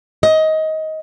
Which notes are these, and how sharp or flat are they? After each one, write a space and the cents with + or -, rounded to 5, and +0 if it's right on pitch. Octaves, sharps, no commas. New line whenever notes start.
D#5 +20